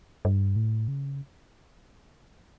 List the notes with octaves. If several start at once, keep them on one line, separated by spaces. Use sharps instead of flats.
G2
A2
C#3